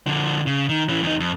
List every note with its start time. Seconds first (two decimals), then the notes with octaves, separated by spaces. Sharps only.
0.07 D3 F3
0.47 C#3
0.69 D#3
0.89 E3 C#4
1.03 E2 D#4
1.20 F2